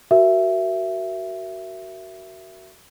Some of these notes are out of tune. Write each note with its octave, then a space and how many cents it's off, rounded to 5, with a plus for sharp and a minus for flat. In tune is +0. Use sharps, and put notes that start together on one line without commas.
F#4 +25 A#4 +0 E5 +15